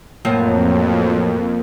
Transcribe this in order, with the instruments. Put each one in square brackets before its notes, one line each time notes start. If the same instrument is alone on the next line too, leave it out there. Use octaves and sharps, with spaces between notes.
[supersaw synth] F2 [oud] A2 F3 F#3 [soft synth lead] A#3